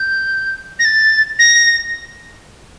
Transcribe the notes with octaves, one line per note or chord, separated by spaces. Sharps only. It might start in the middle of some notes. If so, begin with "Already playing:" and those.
Already playing: G6
A#6
A6
A#6